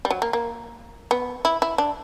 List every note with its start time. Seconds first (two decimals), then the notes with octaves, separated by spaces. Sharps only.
0.05 G3
0.11 F#3
0.22 A#3
0.33 A#3
1.11 B3
1.45 E4
1.62 E4
1.78 D4